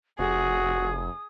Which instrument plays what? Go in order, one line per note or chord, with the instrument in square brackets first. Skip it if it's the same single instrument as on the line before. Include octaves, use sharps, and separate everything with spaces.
[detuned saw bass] F1 [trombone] F#4 [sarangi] G#4 [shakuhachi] D#6